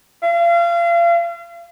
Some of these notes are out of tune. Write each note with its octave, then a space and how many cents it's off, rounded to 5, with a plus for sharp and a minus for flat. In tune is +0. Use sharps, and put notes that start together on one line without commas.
F5 -35